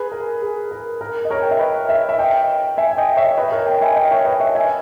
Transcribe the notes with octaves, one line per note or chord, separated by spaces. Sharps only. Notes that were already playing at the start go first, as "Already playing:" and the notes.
Already playing: G#4 B4
A#4
G#4
A#4
A#4
D#5
A#4 C#5
G5
E5
B4 D#5
C#5 E5
E5
D#5 G5
E5 G#5
G#5
D#5 G5
C#5 E5
B4 D#5
A#4 C#5
D#5 G5
E5 G#5
D#5 G5
C#5 E5
B4 D#5
C#5 E5
E5 G#5